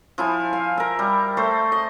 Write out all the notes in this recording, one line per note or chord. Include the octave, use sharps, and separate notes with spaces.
F3 E4 G#5
F5
A#4 E5
G3
A3 C5
D#5